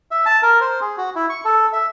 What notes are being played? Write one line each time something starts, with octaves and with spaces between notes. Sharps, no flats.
E5
A5
A#4
C5
G#4
F#4
E4
C#6
A4
E5